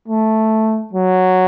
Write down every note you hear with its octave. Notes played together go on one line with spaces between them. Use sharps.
A3
F#3